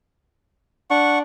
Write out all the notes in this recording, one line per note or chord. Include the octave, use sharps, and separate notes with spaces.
D4 F#5 C#6